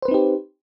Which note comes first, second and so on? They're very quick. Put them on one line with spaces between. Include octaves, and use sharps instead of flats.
C5 B4 C4 D#4 G4